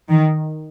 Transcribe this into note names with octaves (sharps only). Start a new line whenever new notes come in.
D#3